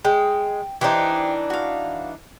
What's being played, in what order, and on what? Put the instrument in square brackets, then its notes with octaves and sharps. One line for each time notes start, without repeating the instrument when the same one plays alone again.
[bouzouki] G#3 [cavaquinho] G5
[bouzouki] E3 D4 D#4 [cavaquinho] G4 C5 D6
[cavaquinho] F#4 F5